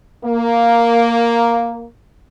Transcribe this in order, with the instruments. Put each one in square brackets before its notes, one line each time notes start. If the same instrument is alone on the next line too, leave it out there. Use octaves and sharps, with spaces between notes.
[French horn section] A#3